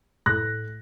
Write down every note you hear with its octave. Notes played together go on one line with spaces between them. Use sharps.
A2 F#6 A#6